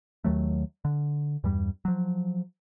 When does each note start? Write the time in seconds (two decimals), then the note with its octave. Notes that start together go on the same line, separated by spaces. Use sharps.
0.24 D#2 D#3 F#3 A3
0.85 D3
1.44 E2 G2 G3
1.85 F3 F#3